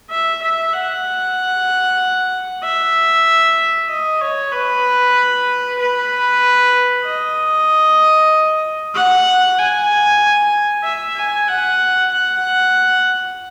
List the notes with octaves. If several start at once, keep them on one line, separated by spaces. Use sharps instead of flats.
E5
E5
F#5
E5
D#5
C#5
B4
B4
D#5
F#5
G#5
E5
G#5
F#5
F#5